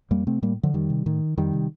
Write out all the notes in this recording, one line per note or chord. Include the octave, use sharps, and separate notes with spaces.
F2 G3 A#3
C3 A3 C4
A2 G3 A#3
D3 F3
F2 D#3 G3
C3
A2 D#3
F2 D#3 G3
C3